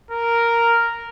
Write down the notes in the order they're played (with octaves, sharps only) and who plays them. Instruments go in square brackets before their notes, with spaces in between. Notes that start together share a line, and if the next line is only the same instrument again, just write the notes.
[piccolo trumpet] A#4